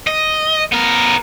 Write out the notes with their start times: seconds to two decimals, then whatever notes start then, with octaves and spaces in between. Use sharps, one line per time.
0.07 D#5
0.72 B3 A#4